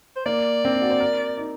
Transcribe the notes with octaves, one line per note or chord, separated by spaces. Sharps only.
C5
A#3 D5
C4
D4
F#4
C5
A#4
D#4